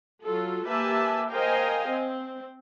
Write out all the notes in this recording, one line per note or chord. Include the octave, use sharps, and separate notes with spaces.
F#3 F4 A4
A#3 G4 B4 E5 G#5 A5
A#4 C5 D#5 F5 G5 G#5
C4